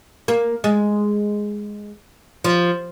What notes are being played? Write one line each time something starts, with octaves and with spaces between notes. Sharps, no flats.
A#3
G#3
F3